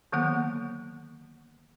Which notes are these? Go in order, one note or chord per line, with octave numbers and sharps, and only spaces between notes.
D3 D#3 F#3 A#3 B3 F#5